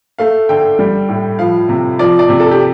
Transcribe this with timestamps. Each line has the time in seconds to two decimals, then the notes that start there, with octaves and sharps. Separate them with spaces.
0.19 A3 F5
0.49 D3 G5
0.79 G3
1.09 A2
1.39 F3 F5
1.69 C3
1.99 F3 D5
2.19 D5
2.29 C3
2.40 A4
2.51 G4